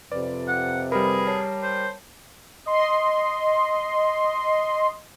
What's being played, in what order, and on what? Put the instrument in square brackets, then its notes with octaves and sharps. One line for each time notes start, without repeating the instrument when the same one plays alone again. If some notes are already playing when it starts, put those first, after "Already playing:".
[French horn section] F2 C3 [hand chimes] B4 [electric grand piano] D5
[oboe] F#5
[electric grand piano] G3 A#4 [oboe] G#4 [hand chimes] B4 B5
[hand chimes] C#5 A5 C7
[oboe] C5
[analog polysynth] D#5 C6